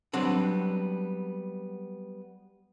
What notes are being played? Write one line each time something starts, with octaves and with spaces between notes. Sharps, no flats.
F#3 G3 B3 C4 D4